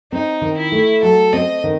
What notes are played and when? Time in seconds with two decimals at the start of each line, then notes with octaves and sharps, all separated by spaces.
0.12 C4 D#4
0.41 D#3
0.57 E4
0.72 A3
1.03 F#3 A4
1.33 C4 D#5
1.64 D#3